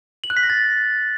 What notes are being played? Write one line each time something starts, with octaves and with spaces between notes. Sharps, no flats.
F#7
F#6
B6
A#6
A6